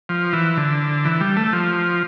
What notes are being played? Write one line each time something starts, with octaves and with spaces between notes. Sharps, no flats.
F3
E3
D3
E3
G3
A3
F3